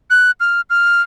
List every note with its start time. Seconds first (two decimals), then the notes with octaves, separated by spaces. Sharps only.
0.10 F#6
0.40 F6
0.70 F6